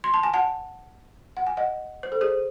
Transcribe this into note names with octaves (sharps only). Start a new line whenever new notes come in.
C6
A5
G#5
F#5 A5
F#5
G#5
D#5 F#5
C5
A4
G#4 C5